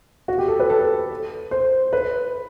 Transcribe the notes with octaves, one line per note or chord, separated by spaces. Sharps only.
F#4
G4
A4
B4
A4
C5
B4